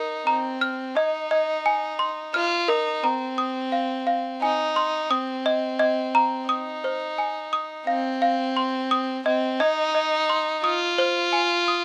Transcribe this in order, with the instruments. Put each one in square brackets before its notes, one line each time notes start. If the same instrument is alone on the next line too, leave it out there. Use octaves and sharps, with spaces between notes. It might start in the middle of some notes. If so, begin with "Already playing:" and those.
Already playing: [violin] D#4 [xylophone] A#4
[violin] C4 [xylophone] A#5
[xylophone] F6
[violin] D#4 [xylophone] D#5
[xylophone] D#5
G#5
C6
[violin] F4 [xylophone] F6
[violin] D#4 [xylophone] A#4
[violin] C4 [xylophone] A#5
[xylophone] D#6
F5
F5
[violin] D#4 [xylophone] G#5
[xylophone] C6
[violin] C4 [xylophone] D#6
[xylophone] D#5
D#5
A#5
[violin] D#4 [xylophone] D#6
[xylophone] C5
G#5
D#6
[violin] C4 [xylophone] F5
[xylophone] F5
C6
D#6
[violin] C4 [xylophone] D#5
[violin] D#4 [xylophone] D#5
[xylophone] D#5
C6
[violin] F4 [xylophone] D#6
[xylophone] C5
G#5
D#6